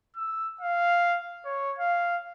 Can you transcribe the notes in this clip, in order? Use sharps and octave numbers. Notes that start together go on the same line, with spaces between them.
E6
F5
C#5
F5